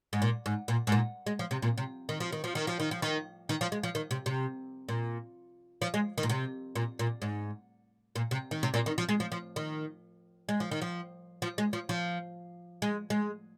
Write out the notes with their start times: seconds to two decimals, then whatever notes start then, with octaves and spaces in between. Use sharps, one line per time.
0.13 G#2
0.22 A#2
0.46 G#2
0.68 A#2
0.87 G#2
0.92 A#2
1.26 G#3
1.39 F3
1.51 C3
1.62 A#2
1.78 C3
2.09 D#3
2.20 F3
2.32 D#3
2.44 F3
2.55 D#3
2.67 F3
2.80 D#3
2.91 F3
3.02 D#3
3.49 D#3
3.61 F3
3.72 G#3
3.83 F3
3.95 D#3
4.11 C3
4.26 C3
4.88 A#2
5.82 F3
5.94 G#3
6.18 D#3
6.23 A#2
6.29 C3
6.75 A#2
6.99 A#2
7.22 G#2
8.16 A#2
8.31 C3
8.51 D#3
8.63 C3
8.74 A#2
8.86 D#3
8.98 F3
9.09 G#3
9.20 F3
9.32 F3
9.56 D#3
10.49 G#3
10.60 F3
10.71 D#3
10.82 F3
11.42 F3
11.58 G#3
11.73 F3
11.89 F3
12.82 G#3
13.10 G#3